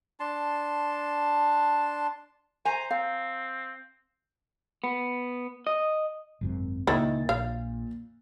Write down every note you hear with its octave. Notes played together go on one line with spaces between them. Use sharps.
D4 A5 C6
C5 G#5 A#5
C4 F5
B3
D#5
G#1 F#2 C3
C#2 A#2 D#3 E4 A6
A#1 F5